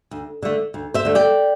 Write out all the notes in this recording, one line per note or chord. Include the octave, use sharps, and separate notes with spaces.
D2
D3 A3
D2
C5 E5
D3 A3
D5 G5